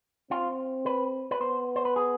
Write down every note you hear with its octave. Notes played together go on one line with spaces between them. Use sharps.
C4 F4
B4
B4
B3 C5
C5
B4
G#4